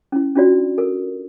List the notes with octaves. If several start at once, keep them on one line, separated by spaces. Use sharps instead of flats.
C#4 E4
C#4 D4 F4 F#4 D5
A4 A#4